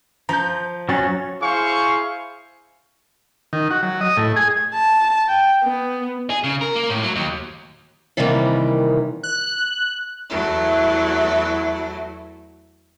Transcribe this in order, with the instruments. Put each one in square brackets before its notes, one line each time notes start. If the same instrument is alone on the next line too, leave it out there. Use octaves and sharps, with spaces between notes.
[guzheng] F3 [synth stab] A#5 G6
[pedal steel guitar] F#3 C#4 [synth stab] A6
[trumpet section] E4 G#4 C5 F5 C#6
[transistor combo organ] D#3
F#4
F#3
D#5
A2
G#4
[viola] A5
G5
B3
[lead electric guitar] G#4
C#3
A#4
A#3
A2
F#3
D#2
[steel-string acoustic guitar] C3 D#3 E3 G3 G#3 A#3
[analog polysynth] F#6
[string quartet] E2 F#3 A3 E4